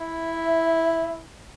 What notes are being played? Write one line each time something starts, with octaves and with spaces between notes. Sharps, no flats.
E4 E5